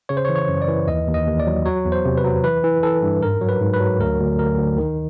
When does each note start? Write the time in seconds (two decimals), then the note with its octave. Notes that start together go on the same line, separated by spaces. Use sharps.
0.09 C#3 C#5
0.17 C5
0.25 C#5
0.29 E3
0.36 C#5
0.49 F#2
0.62 D5
0.68 E3
0.87 D#2 D#5
1.07 D#2
1.14 D#5
1.27 D#2
1.40 D5
1.47 F#3
1.66 F#3 C#5
1.85 E2
1.92 C5
2.05 C3
2.18 B4
2.24 F#3
2.44 E3 B4
2.64 E3
2.83 E3 A4
3.03 G2
3.22 G#2 A#4
3.41 F#3
3.49 B4
3.61 G#2
3.74 B4
3.80 F#3
3.99 D2 A#4
4.20 D2
4.39 D2 A#4
4.58 D2
4.78 D#3